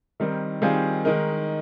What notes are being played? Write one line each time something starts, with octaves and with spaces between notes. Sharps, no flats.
D#3 G3 C4 D#4 A#4
D#3 G3 C4 F4 G#4
D#3 G#3 D#4 A#4